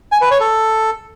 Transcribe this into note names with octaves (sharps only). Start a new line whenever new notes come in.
G#5
B4
C#5
A4